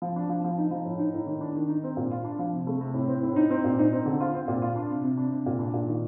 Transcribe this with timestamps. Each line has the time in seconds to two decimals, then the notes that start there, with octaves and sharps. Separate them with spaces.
0.02 F3
0.16 D4
0.29 F3
0.44 F3
0.58 D#4
0.71 F3
0.85 A2
0.99 D#4
1.14 A2
1.27 D#3
1.41 D4
1.55 D#3
1.69 D#4
1.84 C4
1.97 A#2
2.11 F4
2.24 D4
2.39 F3
2.53 C3
2.67 A3
2.81 C3
2.94 A2
3.08 C4
3.23 A2
3.36 D#4
3.50 C4
3.64 A#2
3.79 D#4
3.93 C4
4.06 D3
4.21 F4
4.34 C4
4.48 A#2
4.62 F4
4.76 D4
4.90 C3
5.03 C3
5.18 D4
5.31 C3
5.46 A#2
5.59 D4
5.74 A#2
5.88 D#3